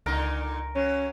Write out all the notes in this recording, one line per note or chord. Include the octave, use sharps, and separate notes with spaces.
C#2 A#2 D3 D#4 A#4
F#3 C#4